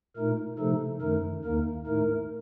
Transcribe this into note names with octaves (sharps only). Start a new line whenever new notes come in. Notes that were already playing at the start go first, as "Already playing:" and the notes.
A#2 A3 D#4 A#4
C3 F3 A3 D#4 A4
F#2 D#3 A3 D#4 A#4
D#2 D#3 A#3 D#4 A#4
A2 A3 D#4 A#4